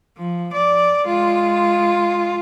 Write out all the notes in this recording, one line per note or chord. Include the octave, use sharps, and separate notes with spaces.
F3
D5
G#3 F4